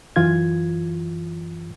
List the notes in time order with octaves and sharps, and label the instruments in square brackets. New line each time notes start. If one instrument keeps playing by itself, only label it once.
[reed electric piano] F#2 E3 F4 G#6